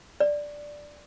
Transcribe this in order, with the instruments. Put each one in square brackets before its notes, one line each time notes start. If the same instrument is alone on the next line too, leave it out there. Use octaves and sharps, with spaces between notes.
[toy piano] D5